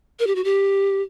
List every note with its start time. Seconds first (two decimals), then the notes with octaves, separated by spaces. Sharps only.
0.19 A#4
0.27 G4
0.35 F#4
0.44 G4